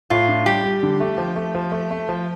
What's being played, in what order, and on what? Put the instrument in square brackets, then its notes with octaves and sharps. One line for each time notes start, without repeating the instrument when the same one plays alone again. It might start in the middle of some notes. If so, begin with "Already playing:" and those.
[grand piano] A2 [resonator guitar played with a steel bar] F4
[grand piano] D4
[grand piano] G3 [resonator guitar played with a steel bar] G4
[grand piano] G3
D3
A3
F3
A3
F3
A3
A3
F3